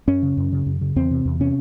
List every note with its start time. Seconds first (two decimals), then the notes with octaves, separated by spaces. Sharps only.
0.07 F#2 C#4
0.23 C#3
0.37 F#2
0.52 C#3
0.66 F#2
0.81 C#3
0.96 E2 C4
1.11 C3
1.25 E2
1.40 C3 C#4